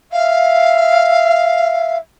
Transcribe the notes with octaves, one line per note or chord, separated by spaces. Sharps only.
E5 F5